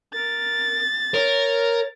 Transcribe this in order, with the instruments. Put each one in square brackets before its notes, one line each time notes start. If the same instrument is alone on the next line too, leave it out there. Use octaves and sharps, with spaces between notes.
[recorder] A#4 [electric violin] A6
[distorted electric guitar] A#4 [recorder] C#5